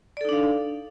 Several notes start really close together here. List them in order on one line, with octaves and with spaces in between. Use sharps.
D5 A4 D#4 D4 F5